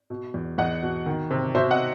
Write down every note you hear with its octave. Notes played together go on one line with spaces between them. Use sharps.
B2
E2
E2 D#5 F#5
B2
D#3
C3
B2 C5 E5
D#5 F#5